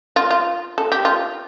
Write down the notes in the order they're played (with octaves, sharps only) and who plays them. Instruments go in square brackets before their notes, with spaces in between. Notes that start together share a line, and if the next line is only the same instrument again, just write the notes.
[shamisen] F4
F4
A4
G4
F4